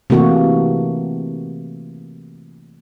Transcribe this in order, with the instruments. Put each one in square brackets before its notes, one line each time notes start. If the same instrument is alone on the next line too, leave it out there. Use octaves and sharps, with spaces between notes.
[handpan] C3 E3 A3 A#3 F#4